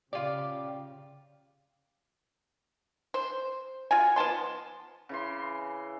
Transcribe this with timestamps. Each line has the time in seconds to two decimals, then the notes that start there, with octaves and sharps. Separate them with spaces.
0.13 C#3 F4 G4 D5
3.14 C5
3.91 F4 F#4 G#5
4.16 F3 B3 A5 C6
5.09 C#3 E3 C6